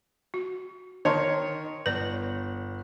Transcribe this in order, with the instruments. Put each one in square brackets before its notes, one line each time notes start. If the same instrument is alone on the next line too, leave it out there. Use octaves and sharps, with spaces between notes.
[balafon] F#4
[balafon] D3 A5 C6 [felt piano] D#3 A#4 [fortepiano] C#5
[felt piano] G1 [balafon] B4 D5